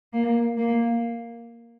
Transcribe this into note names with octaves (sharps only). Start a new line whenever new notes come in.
A#3
A#3